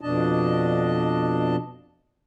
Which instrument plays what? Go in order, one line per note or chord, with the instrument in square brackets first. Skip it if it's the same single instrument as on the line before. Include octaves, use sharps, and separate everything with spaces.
[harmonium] F2 B2 D4 D#5 A5